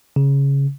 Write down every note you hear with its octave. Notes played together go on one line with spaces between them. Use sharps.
C#3